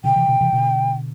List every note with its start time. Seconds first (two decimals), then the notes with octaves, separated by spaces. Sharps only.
0.04 B2 D3 G5
0.16 C3 E3
0.28 B2 D3
0.41 C3 E3
0.53 B2 D3